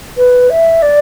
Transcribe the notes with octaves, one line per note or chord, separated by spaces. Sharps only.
B4
E5
D5